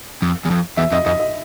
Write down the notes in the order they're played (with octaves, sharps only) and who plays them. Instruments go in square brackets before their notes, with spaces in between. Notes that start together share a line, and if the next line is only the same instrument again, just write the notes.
[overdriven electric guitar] F2
E2
F2
[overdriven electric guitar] E2 [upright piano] E5
[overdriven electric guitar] F2 [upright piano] D#5
[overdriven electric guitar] F2 [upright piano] D#5
[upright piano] D#5